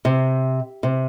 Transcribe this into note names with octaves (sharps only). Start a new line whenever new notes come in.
C3
C3